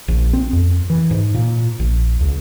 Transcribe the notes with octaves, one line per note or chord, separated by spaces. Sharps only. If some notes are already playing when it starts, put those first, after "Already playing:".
A#1
C4
F2
E3
G#2
A#2
A#1
C#2